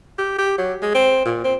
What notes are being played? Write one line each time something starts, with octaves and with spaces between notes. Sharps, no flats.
G4
G4
F#3
G#3
C4
A#2
C4